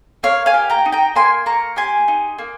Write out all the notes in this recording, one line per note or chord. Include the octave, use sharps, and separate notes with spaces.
A#3 C#5 F5
F5 G#5
G4
G5 A#5
D#4
G5 A#5
A#3 G#5 C6
A#3 A#5 C#6
G4 G#5 C6
D#4
A#3